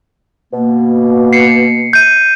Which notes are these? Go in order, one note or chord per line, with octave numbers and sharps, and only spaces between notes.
B2 A#3
C7 C#7
G6 D#7